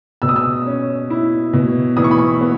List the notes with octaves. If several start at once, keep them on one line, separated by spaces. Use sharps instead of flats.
B2 E6
D#6
E6
C#4
E4
B2
E3 D#6
C#6
B5
C#6
B3